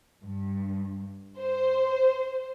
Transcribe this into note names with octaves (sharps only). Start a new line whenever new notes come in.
G2
C5